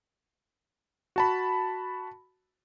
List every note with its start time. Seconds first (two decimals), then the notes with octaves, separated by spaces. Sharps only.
1.16 F#4 A5 B5